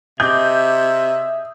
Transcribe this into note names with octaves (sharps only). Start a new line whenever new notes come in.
C3 G#4 D#5 E5 D6 G6